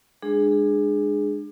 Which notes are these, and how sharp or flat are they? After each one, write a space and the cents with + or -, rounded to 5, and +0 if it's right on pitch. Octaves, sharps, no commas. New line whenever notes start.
G#3 -15 D4 +30 G#4 +0